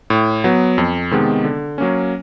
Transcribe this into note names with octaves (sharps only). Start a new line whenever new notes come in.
A2
F#3 B3
F2
C3 D#3 G#3 B3
D3
F#3 A#3 C#4